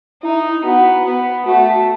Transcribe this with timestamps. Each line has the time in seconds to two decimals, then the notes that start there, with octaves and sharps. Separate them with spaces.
0.23 D#4 E4
0.64 B3 F#4
1.05 B3
1.46 A3 F#4